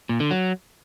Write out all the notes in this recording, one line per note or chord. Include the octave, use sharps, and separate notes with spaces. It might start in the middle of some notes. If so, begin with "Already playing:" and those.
A#2
D3
F#3